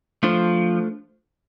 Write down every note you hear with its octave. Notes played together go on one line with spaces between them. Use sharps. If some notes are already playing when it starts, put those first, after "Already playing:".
F3 A3 D4 F4 A4 C5